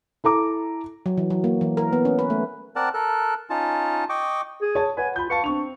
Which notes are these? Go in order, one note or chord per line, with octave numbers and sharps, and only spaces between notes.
E4 A4 A#5 D6
F#3
E3
F#3
A#3
E3
A#4
B3
C#4
B4
A3
C4 A#4 D5 F#5 A5
A4 A#4 F#6
C#4 D#4 F4 A5
D#5 G5 C#6 D6
G#4
C#5 A5
B4 C#5 F#5 G#5
F4 B5 G6
B4 F5 A5 C#6
C4 D4 C#6 F7